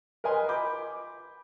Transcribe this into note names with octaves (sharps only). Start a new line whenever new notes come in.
A#4 B4 D#5 G#5 C6
B5 D6 G6